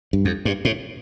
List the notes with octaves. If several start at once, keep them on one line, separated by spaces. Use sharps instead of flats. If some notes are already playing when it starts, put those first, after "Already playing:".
G2
F2
G2
A2